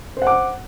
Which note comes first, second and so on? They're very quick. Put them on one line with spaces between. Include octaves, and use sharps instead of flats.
C5 F#5 D6